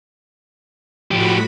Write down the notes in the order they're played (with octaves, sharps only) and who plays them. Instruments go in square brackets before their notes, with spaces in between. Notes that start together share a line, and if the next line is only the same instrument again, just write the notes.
[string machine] A2 F#4 B5 [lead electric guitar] F3 G4